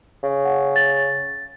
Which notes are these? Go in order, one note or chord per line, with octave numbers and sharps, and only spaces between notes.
C#3
F#5
A6